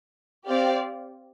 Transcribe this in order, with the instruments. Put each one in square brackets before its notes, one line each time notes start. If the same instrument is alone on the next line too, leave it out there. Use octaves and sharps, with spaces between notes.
[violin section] C4 G4 D5 F5